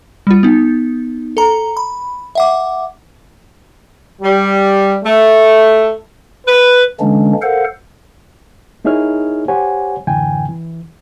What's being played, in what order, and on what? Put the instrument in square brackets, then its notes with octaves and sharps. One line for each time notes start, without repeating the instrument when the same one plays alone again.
[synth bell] G3 F4
B3 D#4
A4 A#5
B5
E5 F#5 D6
[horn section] G3
A3
B4
[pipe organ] D3 E3 G#3 A#3 C#4 D4
A4 A#4 C5 F5 F#5
[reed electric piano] A#3 D#4 E4 G#4 C#5 F6
G4 C5 C#5 F#5 G#5
F#2 A2 D3 E3 G5 G#5
E3